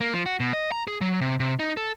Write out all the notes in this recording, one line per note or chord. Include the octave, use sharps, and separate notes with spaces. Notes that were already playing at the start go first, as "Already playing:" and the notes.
A#3
F3
F#4
B2
D#5
A#5
G#4
F#3
C3
C3
D#4
A4